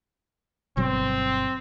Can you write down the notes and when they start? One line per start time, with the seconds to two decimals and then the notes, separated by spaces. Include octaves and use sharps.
0.77 G1 B2 F#3 C4